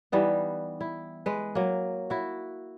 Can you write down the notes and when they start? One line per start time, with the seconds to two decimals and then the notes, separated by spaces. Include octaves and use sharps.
0.12 E3 G3 B3 D#4
0.81 E4
1.26 G#3 B4
1.55 F#3 A#3
2.10 E4 F#4